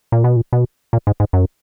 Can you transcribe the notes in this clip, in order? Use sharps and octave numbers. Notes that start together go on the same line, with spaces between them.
A#2
B2
A#2
B2
A#2
G#2
G#2
F#2